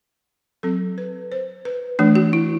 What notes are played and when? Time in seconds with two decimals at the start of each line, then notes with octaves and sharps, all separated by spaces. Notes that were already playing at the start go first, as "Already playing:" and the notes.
0.63 F#3 C4 A4
0.98 B4
1.32 C5
1.65 B4
1.99 E3 A3 D4
2.15 F#4
2.33 E4